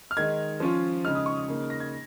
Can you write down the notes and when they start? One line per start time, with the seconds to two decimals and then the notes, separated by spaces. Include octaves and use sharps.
0.11 F6
0.17 D#3 G#3 D#4 G#6
0.60 F3 C#4 F4
1.04 C#3 G#3 D#4 F6
1.15 D#6
1.26 C#6
1.37 D#6
1.48 C#3 A#3 D#4
1.70 A#6
1.80 G#6